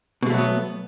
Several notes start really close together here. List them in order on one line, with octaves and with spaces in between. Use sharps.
B2 G#3 A3 F#3 B3